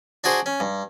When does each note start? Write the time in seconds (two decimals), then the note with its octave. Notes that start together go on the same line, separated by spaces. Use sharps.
0.24 D4 F#4 G#4 C5
0.46 C#4
0.60 G2